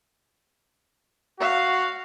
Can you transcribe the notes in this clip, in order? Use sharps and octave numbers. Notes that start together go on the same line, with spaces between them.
F#4 F5